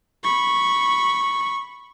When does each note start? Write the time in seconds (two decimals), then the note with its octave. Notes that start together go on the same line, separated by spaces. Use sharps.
0.24 B5 C#6